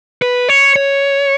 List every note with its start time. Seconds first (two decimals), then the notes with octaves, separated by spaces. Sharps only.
0.22 B4
0.49 C#5
0.76 C#5